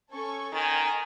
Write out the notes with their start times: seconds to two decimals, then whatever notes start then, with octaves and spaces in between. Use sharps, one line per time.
0.12 C#4 A4 C#6
0.53 D#3 G#5 A#5 A6